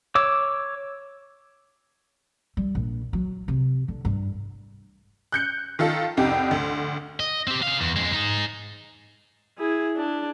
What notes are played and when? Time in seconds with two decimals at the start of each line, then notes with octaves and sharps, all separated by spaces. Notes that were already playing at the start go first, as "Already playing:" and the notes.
0.15 C#5 D6 E6
2.57 G3
2.75 A#1
3.13 F#3
3.48 C3
3.88 D3
4.05 G2
5.32 F#6 G6 C#7
5.79 D#3 F4 A4
6.17 C2 F2 D#4 G4
6.51 D2
7.20 D#5
7.48 C4 G4
7.63 G#4 F5
7.81 E2
7.96 F2 G#3
8.14 D#4 G#4
9.58 E4 G#4
9.97 D4